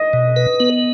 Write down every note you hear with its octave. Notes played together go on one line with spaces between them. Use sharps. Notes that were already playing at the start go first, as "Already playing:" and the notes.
Already playing: D#5
B2
B4
B3